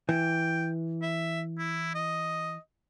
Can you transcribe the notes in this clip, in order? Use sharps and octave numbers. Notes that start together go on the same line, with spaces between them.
E3 G5
E5
E4
D#5